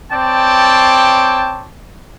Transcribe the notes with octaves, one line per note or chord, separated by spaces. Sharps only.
C4 C#5 D5 G5 A5